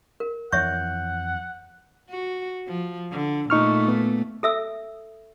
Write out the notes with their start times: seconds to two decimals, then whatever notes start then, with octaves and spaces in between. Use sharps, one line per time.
0.20 A#4
0.52 F2 E3 C#5 E5 F#5 C#6 G6
2.10 F#4
2.68 F3
3.12 D3
3.50 A#2 A3 D#4 C#6 F6
3.88 B3
4.43 A4 E5 E6